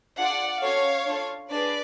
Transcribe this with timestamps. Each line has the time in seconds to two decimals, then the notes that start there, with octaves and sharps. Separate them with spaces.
0.17 D4 F4 G#4 D5 F#5
0.61 C#4 F#4 A4 C#5 F5
1.06 D4 F4 A4
1.50 D4 G#4 B4 D5